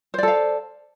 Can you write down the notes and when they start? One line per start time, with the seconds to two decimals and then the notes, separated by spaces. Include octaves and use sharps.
0.14 C5
0.18 D5
0.23 A4
0.28 F5